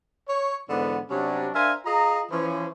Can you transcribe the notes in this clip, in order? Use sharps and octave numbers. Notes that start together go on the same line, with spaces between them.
C#5
G#2 D3 E3 B3
C3 F#3 G3 C#4 D4
D4 A#4 C5 E5 F5 G#5
F4 G#4 D#5 A#5
E3 F3 C#4